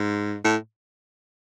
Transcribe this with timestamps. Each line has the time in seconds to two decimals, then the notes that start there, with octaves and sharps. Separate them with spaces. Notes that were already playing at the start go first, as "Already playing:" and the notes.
Already playing: G#2
0.44 A2